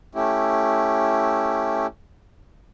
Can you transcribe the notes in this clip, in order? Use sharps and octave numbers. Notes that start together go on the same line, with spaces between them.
A3 C#4 E4 G4